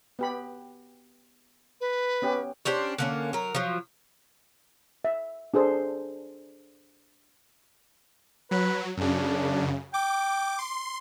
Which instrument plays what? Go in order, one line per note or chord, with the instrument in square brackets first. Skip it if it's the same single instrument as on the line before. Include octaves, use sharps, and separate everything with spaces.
[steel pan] B3 G4 B5
[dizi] B4
[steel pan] B3 C#4 G4
[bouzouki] C#4 D4 G4 C5
D3 A#3 C#4
F#3 A#4
F3 F#3
[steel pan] E5
D4 G#4 A4 C5
[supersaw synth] F#3 [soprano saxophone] B4
[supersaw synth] F#2 C#3 [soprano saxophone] D4
[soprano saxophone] G5 [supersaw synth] D6
[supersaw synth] C6